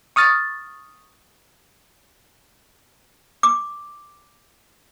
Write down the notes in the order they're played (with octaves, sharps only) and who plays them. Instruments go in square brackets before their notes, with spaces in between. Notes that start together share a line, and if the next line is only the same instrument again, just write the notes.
[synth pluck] C#6 D#6 F6 A6
[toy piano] D6